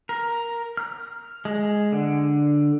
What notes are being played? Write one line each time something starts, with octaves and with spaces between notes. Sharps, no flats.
A#4
F6
G#3
D3